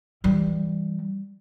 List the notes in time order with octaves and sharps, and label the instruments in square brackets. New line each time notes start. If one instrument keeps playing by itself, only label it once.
[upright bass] E3 G3